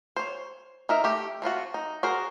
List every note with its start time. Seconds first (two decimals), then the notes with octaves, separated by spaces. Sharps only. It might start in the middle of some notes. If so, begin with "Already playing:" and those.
0.16 C5 C#5
0.89 D#4 A#4 E5
1.04 A3 G4
1.42 A3 C4 F4 F#4
1.74 D#4
2.03 F#4 G#4 A#4 C5